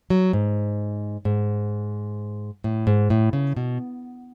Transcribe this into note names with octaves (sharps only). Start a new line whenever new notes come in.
F#3
G#2
G#2
A2
G#2
A2
C#3
B2